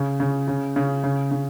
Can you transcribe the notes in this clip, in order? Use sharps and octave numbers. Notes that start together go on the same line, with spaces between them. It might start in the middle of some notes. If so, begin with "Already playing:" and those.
Already playing: C#3
C#3
C#3
C#3
C#3
C#3